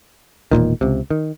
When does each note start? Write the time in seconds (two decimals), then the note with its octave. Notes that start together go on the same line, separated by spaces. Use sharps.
0.51 E1 B1 A#2 D#3
0.81 C#2 C3
1.10 D#3